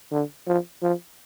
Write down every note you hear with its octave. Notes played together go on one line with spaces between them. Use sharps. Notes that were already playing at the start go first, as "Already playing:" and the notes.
D3
F3
F3